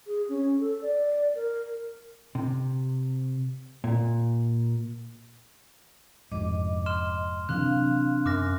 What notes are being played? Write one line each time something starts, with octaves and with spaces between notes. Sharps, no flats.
G#4
C#4
A4
D5
A#4
C3
A#2
F1 F2 G#2 D#5 D6
C6 F6 E7
C3 E3 F#3 C4 D4 F5 F#6
F#2 D6 F6 A#6